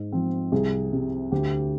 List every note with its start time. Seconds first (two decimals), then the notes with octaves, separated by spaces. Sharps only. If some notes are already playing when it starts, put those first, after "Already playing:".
Already playing: G#2
0.12 F3 C4
0.52 C2 G#4
0.92 C3 G3
1.32 D2 G4